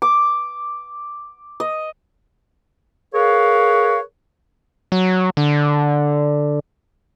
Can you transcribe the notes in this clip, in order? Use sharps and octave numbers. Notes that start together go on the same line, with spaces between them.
D6
D#5
G#4 A#4 B4 C#5 F5
F#3
D3